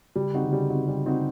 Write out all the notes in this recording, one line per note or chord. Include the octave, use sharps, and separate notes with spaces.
C#3 G3
C#3 C4 D#4 F#4
D3
C#3 G3
C4 D#4 F#4
G3
C4 D#4 F#4